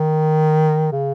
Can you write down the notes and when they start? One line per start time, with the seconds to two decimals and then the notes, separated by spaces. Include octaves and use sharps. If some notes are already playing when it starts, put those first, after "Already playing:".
Already playing: D#3
0.92 C#3